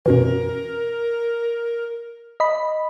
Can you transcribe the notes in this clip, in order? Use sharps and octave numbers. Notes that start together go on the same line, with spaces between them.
F#2 B2 E3 A#4
D#5 B5